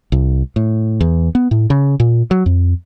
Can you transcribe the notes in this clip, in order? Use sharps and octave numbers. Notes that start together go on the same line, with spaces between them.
C2
A2
E2
B3
A2
C#3
A#2
F#3
F2